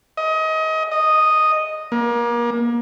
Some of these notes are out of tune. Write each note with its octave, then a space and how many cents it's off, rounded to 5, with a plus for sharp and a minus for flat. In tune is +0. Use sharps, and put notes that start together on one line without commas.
D#5 +25
D#5 -5
A#3 +30